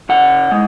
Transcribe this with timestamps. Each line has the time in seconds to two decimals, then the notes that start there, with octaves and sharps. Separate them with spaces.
0.09 C#3 F#5
0.52 G#3